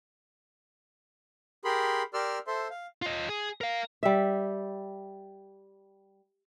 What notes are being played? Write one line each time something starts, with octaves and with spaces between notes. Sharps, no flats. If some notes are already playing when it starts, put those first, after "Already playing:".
G4 G#4 A#4 B5 C6
G4 A#4 D5 C6 E6 F6
A4 C5 E5 C6
F5
F4 D#5
G#4
A#4 F5
G3 E5